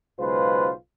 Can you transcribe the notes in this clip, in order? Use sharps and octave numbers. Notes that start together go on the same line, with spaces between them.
B1 C#3 G#3 F4 B4 C5